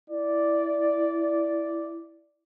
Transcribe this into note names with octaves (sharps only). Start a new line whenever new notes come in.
E4 D5